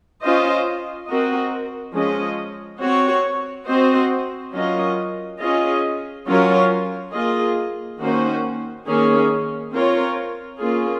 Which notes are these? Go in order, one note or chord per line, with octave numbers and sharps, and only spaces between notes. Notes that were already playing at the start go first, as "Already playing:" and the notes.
C#4 F4 C5 D#5
C4 F#4 A#4 D#5
F3 G#3 C#4 G#4 D#5
C4 F#4 C#5
C4 F#4 C5 D#5
F#3 C#4 F4 A#4 D#5
C#4 F4 G#4 D#5
F#3 C#4 F4 A#4 C#5
A#3 F4 G#4 D#5
D#3 A#3 C#4 F#4 C5
D#3 A#3 C#4 G#4
C4 F4 A#4 C#5
A#3 C#4 F4 G#4